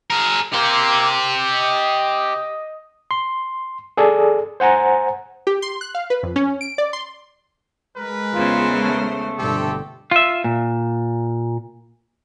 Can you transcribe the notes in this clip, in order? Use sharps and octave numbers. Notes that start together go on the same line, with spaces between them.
G#4 A#4
A#3 G4 C5
D#5
C6
G#4 A4 D5
C5 F#5 G#5 A#5
G4
C6
F#6
F5
B4
F2
C#4
D7
D5
C6
G#3 A#4 B4
E2 C#3 F4 C5
A3
G1 B2 D3 C4 G4 A4
F4 E5
A#2